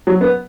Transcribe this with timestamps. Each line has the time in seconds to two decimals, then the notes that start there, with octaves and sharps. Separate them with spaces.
0.07 F#3
0.21 B3